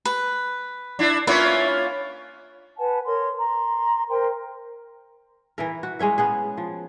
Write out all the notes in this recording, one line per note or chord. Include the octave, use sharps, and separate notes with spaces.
B4
D4 E4
A#3 C#4 F4 B4 D5 E5
B4 F#5 G#5 A5
A#4 C#5 C6
A#5 C6
A#4 C5 G5 C6
E3 E4 A#4
F#4
G#3 C#4 C#5 E5
B3 C#4 G#4
F3